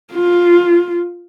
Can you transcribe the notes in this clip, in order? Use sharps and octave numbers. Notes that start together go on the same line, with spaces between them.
F4